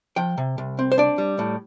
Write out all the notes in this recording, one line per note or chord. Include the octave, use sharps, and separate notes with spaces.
F3 G5
C3
C2
C4
C5
D4 D5
G3
A2